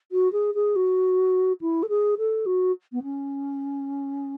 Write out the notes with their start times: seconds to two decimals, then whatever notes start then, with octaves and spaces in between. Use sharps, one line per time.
0.12 F#4
0.32 G#4
0.54 G#4
0.76 F#4
1.61 E4
1.83 A4
1.89 G#4
2.18 A4
2.46 F#4
2.92 B3
3.03 C#4